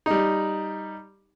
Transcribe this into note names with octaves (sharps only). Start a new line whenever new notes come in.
G3 D#4